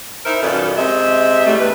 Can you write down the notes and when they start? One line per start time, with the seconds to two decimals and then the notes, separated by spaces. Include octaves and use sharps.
0.25 D#4 E4 A#4 C5
0.42 F#2 A#2 D#3 A4 B4
0.77 C3 G#3 E5
1.46 A2 G3 A3
1.59 E2 G2 B4